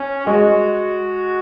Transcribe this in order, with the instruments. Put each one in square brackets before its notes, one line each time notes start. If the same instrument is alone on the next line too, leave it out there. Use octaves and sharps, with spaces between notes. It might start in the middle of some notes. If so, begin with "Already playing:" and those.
Already playing: [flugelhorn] C#4
[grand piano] G#3 [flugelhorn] F#4